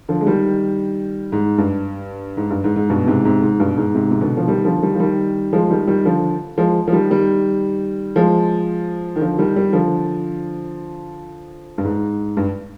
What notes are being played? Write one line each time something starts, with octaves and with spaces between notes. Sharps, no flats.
D3 F3
G#3
D#3 G3
G#2
G2
G#2
G2
G#2
G#2
G2 B2
G#2 C3
G#2 C3
G#2
G2 B2
G#2
G#2 C3
C3
B2 D3
F3
D#3 G3
D3 F3
D#3 G3
F3
D#3 G3
F3 G#3
D#3 G3
D#3 G3
D3 F3
F3 G#3
F3
D#3 G3
D#3 G3
F3 G#3
D#3
D3 F3
D#3 G3
D#3 G3
D3 F3
G2
G#2
G2